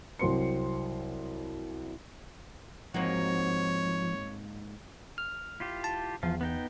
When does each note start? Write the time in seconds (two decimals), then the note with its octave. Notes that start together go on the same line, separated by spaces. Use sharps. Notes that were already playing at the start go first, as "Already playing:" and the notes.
0.19 C2 F#3 C4 C6 C#7
2.94 G#2 F3 A#3 C4 D#4 F#4 C#5
5.18 F6
5.60 E4 F4 G4
5.84 A5
6.23 E2 F3 F4
6.41 B3 D#4 G5